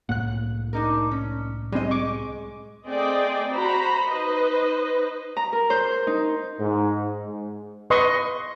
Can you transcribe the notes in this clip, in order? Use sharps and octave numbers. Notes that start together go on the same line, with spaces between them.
C2 A2 A#3 F#5 F#6
D4 D#4 A#4
C#4
G3 G#3 C4 D#5
C#6 D6
A3 C4 G#4 D5 D#5 G5
F#4 C5 A#5 B5
D#4 B4 C5 D#5
A#5
A#4
C5
C6
D#4
G#2
G#2
B4 D#5 C6 C#6